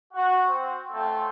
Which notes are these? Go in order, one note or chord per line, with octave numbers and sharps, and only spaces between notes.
F#4 F#5
C4
A3 C#4 F4 A4 G5 C6